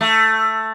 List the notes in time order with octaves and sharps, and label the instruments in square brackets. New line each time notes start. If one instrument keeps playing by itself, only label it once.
[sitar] A3